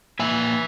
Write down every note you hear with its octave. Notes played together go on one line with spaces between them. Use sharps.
A#2 E5 G#5